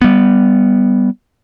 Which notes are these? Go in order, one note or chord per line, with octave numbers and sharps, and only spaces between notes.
G3 B3